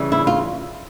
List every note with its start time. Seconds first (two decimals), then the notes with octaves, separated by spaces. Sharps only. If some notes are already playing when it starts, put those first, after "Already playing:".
Already playing: C#3 E3 G3
0.12 E4
0.27 F4